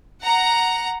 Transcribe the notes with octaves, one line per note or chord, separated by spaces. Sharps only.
F#5 A#5